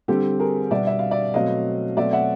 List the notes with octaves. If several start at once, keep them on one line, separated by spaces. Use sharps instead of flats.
D3 G3 C4 G4 A4
G#4 A#4
B2 G3 B3 D5 E5
E5
F5
D5 E5
B2 F#3 A3 C4 D#5 F5
B2 F#3 A3 C4 D5 E5
E5 F#5